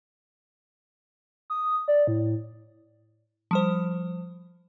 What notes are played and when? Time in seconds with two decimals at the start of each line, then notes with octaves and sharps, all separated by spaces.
1.50 D#6
1.88 D5
2.07 A2
3.51 F3 G3 C5